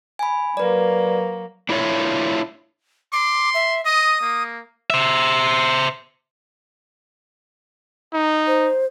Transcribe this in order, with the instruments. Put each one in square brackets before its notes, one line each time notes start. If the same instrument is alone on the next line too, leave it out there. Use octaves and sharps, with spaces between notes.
[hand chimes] G#5 B5
[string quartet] F#3 A#3 [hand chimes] B4 D5
[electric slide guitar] D4 E4 F4 C#5 E5
[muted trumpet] C6 [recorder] D6
[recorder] E5
[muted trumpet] D#5 [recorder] D#6
[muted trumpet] A#3
[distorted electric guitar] C5 E5
[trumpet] D#4
[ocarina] C5